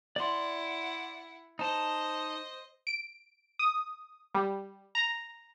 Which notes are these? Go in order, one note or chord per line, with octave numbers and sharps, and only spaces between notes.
E4 D5 F#5 C6
D#4 C5 D#5 A5
D7
D#6
G3
A#5